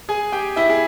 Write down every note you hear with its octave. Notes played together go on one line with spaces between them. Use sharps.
G#4 G#5
G4 G5
E4 E5
G#4